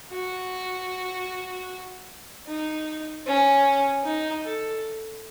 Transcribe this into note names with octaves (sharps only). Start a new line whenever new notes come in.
F#4
D#4
C#4
D#4
A4